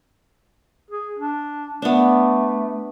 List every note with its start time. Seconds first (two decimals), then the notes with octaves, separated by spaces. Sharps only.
0.90 G#4
1.18 D4
1.82 A3 B3 D4